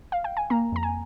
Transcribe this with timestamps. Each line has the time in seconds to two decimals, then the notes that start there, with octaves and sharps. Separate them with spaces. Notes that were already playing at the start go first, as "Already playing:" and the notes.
0.12 F5
0.24 G5
0.37 G#5
0.50 A#3 A#5
0.72 F2 A#5
0.83 G#5